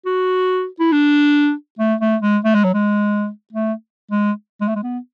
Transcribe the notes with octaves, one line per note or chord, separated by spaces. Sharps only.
F#4
E4
D4
A3
A3
G#3
A3
G#3
F#3
G#3
A3
G#3
G#3
A3
G#3
B3